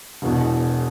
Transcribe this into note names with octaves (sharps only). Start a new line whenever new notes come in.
E1 E2 B2